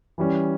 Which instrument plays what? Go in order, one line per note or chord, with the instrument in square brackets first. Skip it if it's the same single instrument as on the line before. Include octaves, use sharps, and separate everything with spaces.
[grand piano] E3 G3 C#4